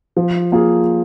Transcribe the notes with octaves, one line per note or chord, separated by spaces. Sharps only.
F3
A#3 F4 G#4